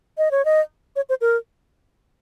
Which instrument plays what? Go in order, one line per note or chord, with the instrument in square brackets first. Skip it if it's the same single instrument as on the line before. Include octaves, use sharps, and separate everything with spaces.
[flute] D#5
C#5
D#5
C#5
C5
A#4